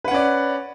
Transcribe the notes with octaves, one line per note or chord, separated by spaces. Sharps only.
C#4 B4 D5 F#5